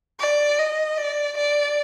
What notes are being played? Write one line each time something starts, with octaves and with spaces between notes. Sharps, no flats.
D5
D#5
D5
D5